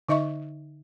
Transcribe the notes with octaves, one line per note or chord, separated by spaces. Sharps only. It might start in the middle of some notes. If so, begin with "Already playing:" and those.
D3 D#4 D#5 E5 C#6